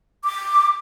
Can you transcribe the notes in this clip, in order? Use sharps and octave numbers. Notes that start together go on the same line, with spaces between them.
D6